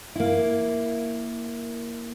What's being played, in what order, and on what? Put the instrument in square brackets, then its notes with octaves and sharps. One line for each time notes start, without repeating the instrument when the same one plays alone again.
[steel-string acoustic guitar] A#3 E4